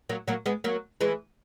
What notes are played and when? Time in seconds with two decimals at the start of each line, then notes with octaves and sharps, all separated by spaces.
0.09 F#3 A#3
0.28 F#3 A#3
0.46 G#3 B3
0.64 F#3 A#3
1.01 E3 G#3